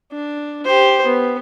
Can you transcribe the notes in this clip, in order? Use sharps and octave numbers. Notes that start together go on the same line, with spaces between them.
D4
G4 C5
B3